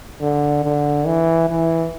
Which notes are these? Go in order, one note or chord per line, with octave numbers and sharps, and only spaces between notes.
D3
D3
E3
E3